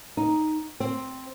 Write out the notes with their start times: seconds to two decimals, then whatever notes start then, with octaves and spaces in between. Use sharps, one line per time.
0.17 D#4
0.80 C4